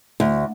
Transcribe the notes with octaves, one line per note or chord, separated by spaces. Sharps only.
D2